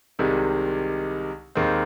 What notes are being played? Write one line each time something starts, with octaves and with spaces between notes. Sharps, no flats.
C2 C3 D#3 G#3
D#2 D#3 G#3 C4